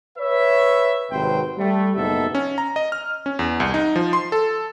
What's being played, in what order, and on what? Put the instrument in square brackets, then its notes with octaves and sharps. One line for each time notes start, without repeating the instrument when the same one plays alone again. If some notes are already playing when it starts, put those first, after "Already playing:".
[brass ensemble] B4 C#5 E5
G#1 C3 F#3 B4 C5 G5
G3 A3
F#1 B2 B3 D#4 A4 E5
[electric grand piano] C#4
A#5
D#5
F6
C#4
E2
C2
D#4
F3
C6
A4